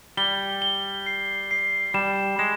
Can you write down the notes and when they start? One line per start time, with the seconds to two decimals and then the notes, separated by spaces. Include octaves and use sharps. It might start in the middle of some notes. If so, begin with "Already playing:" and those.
0.17 G3 G7
0.62 G7
1.06 C7
1.51 C7
1.94 G3 E7
2.39 G#3 E7